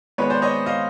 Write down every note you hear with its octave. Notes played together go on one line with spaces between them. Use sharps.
D#3 G#3 B3 B4 C#5
C5 D5
C#5 D#5
D#5 F5